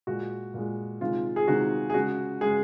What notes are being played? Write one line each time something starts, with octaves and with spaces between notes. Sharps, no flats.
A#2 G#3 F#4
A#2 G#3
C3 D#3 G#3 F4
G#4
C3 D#3 G#3 F#4
G#4
C#3 G#3 F#4
C#3 G#3 G#4